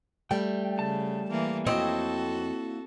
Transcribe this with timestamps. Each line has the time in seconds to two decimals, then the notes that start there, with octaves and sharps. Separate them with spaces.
0.31 G3 A3 G5
0.79 C#3 A5
1.30 E3 A#3
1.67 F2 A#3 C4 E4 F#4 A4 C#5 D#5